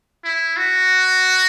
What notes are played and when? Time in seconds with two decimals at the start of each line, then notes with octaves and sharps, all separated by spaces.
0.25 E4
0.57 F#4